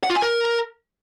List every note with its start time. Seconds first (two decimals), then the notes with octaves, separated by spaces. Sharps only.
0.03 F#5
0.10 F4
0.16 G#5
0.22 A#4